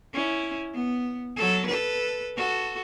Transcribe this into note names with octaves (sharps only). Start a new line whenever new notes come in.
C#4 E4
B3
F#3 A4
A4 B4
F#4 A4